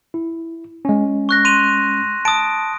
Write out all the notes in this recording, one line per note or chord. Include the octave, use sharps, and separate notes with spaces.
E4
G#3 C#4
C#6 F#6 A#6
C6 D#7 F7
A5 D#6 D7